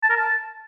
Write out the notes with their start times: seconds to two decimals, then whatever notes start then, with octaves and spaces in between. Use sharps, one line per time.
0.03 A5
0.10 A#4
0.16 A5